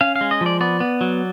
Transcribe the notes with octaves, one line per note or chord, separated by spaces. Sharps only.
C#4 F5
F5
G#3
D#5
F3
D5
B3 D5
B3
F#3